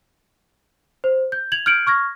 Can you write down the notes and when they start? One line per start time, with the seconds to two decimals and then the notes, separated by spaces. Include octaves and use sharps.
1.04 C5
1.32 G6
1.52 G#6 F7 F#7
1.66 F6 G6 G#6 C#7 D7 F#7
1.87 C#6 F6 G#6 A#6